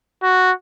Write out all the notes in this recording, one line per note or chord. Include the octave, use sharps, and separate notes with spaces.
F#4